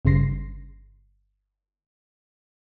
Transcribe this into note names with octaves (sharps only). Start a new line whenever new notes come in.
G1 G2 C#3 C6 A#6 C7